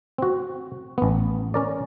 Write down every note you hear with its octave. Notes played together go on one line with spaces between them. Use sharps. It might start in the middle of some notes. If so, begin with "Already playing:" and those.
C4 F#4
A1 B3
C#4 A#4 D5